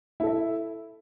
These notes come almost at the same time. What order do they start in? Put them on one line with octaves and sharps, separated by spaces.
E4 A4 E5